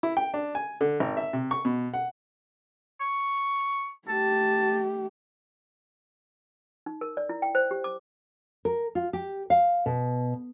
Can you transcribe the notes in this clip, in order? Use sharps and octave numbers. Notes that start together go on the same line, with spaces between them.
E4
G5
D4
G#5
D3
G#1
E5
C3
C#6
B2
F#5
C#6
A3 G4 A5
D#4
A#4
D5
E4
G5
C5
G4
D6
A#4
F4
G4
F5
B2